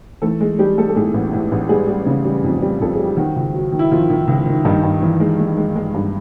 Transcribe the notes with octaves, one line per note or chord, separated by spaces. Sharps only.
E3 A3 A4
G#3 G#4
G3 G#3 G4
G#3 A3 A4
A4
A2 G#3 G#4
A1
A2
A1
G3 G#3 G#4
G3
C#3
G3
F2
G3
F2 A4
G#4
G3
G4
D#3 F#3 F#4
C#2
F#3
D#3
E4
D#3 F3 F4
D#3
C#2
D#3
G2 D#3 D#4
G2
E3
G#3
G#3
G#3
G#3
G2